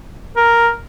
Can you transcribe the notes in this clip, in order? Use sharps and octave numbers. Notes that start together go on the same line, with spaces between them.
A#4